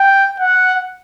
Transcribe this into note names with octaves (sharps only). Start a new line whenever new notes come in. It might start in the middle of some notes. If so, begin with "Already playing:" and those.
Already playing: G5
F#5